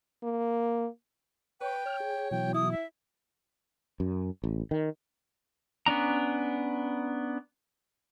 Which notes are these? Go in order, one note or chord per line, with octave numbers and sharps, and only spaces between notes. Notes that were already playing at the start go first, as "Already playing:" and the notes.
A#3
B4 C#5 G5
C#5 F6
G#4
B2 E3 F#3 G5
E4 D#6
E5
F#2
A1
D#3
B3 C#4 D4 A#5